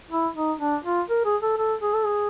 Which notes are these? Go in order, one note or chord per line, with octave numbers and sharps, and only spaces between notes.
E4
D#4
D4
F4
A#4
G#4
A4
A4
G#4
A4
G#4